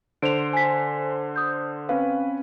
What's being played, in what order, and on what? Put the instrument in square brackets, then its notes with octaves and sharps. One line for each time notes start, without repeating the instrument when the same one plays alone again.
[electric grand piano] D3 C5 [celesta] D7 F7
[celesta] G#5 B6
D#6 G6
[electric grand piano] C4 C#4 B4 [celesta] F5